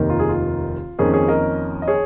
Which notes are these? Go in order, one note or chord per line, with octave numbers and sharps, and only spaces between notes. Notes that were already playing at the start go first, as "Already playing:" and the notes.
Already playing: F1 D#2 D#3 A#3
F4
G#4
F4
F2 D#3 A#3 C#4 G#4
G#4 C#5
A#4 D#5
D#5
G#4 C#5